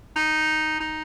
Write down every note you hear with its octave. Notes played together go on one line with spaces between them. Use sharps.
D#4
D#4